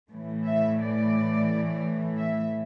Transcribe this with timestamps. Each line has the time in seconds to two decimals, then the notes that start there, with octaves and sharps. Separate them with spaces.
0.11 A2 E3 A3
0.45 E5
0.80 D5
2.18 E5